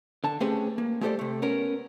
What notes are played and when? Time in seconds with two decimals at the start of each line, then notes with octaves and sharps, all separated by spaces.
0.24 D3 A5
0.40 A3 C4 C#4 G4 G#4 B4
0.78 A#3
1.01 G#3 A3 G4 A4 C5 D5
1.19 C3 A3
1.42 B3 C#4 A#4